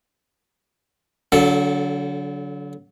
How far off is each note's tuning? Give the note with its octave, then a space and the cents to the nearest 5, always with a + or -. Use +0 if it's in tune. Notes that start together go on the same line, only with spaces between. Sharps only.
D3 -35 F#3 +0 A4 +0